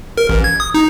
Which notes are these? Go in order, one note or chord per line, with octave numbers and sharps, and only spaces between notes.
A#4
A1
G#6
D#6
D#4